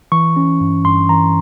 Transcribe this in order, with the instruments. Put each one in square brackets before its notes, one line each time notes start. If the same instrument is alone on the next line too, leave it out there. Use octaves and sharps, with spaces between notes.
[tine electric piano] E3 C#6
C#4
G2
G2 C6
E3 A#5